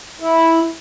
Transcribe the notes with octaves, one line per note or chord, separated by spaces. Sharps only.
E4